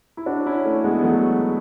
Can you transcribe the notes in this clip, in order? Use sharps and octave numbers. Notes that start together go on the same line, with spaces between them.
E4
D4 F#4
C#4 E4
A3 C#4
G#3 B3
B3
F#3 A3